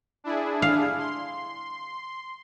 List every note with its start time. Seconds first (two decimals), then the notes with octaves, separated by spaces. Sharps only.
0.24 D4 E4 G#4
0.62 F5
0.98 C6